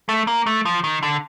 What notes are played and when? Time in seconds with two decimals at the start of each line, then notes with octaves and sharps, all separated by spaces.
0.09 A3
0.27 A#3
0.47 A3
0.65 F3
0.84 D#3
1.03 D3